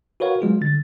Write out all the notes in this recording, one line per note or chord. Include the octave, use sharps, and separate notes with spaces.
F#4 A#4 B4 C#5 F5 F#5
F#3 G#3 F4 G#4
D3 G3 A6